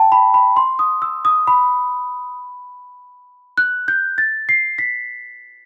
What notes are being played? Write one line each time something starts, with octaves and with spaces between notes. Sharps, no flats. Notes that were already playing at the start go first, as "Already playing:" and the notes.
Already playing: G5 A5
B5
B5
C6
D#6
E6
D#6
B5
F#6
G6
A6
C7
B6